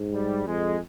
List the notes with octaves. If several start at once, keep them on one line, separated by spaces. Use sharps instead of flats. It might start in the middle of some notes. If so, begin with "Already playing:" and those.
Already playing: G#2
G3
F2 G#3